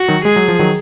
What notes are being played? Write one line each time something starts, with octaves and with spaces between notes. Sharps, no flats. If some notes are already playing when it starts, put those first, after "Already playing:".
Already playing: F#4
D#3 F#3
G#3 G#4
F#3
F3
D#3 F#3